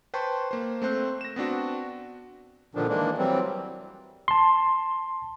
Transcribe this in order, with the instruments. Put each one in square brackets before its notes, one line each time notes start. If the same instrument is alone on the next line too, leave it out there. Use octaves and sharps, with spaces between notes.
[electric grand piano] B4 C5 G5 A5 C6 C#6
A#3 C5
A3 C4 C5 F#6
A#6 E7
B3 C4 D4 F#4
[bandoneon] A#2 D3 D#3 F3 D4
D#3 E3 G#3 A#3 D4
E3 F#3 G3 C4
[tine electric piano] A5 C6